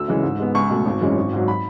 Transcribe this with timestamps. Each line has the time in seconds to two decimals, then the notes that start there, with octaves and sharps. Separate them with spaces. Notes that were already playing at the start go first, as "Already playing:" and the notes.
Already playing: D2 E6
0.08 C#3 E3 G#3
0.23 G#2
0.39 G#3 B3
0.55 C#2 C#6
0.70 B2 A3
0.86 G#1
1.01 F#2 E3 G#3 C#4
1.17 G#1
1.33 G#2 F#3
1.48 B5